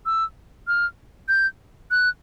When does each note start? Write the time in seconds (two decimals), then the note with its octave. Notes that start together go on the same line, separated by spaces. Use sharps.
0.06 E6
0.67 F6
1.28 G6
1.91 F#6